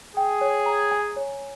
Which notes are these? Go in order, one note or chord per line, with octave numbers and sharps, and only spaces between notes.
G#4 G5
C#5
A#5
G#5
C#5